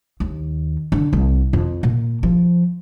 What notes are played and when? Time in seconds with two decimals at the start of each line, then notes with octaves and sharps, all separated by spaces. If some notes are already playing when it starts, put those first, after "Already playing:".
0.20 D#2
0.92 D3
1.13 C2
1.53 F2
1.83 A#2
2.23 F3